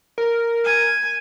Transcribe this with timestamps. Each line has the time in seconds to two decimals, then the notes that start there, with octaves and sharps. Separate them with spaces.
0.18 A#4
0.64 G#5